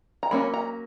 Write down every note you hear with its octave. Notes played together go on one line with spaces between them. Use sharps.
A#5
F#3 A#3 C#4 B5
A#5